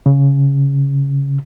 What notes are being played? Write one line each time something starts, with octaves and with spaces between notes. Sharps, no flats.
C#3